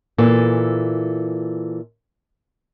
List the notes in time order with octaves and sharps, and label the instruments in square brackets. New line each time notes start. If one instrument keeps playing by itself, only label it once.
[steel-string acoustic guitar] A#2 E3 A4